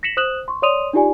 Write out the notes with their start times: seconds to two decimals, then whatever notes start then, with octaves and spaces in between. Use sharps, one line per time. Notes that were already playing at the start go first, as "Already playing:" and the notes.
0.03 A#6 B6 C#7 E7 F#7
0.17 C5 D#6 F#6 E7 F#7
0.48 C6 C#6
0.62 C#5 D5 C6 D#6 D#7 F7
0.93 D4 D#4 F4 G4 D5 G#5